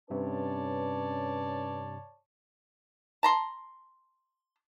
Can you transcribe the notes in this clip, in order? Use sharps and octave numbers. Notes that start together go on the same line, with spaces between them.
G2 C3 C#4 B4 C#5 D5 A5
A5 A#5 C6